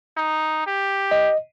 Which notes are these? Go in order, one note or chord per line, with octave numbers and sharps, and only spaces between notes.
D#4
G4
D#5